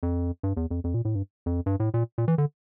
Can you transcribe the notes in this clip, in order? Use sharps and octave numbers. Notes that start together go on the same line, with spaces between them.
F2
G2
E2
F2
F2
A#2
A2
G2
F2
G2
A2
A#2
A#2
E3
D3